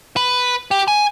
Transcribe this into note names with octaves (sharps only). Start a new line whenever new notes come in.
B4
G4
G#5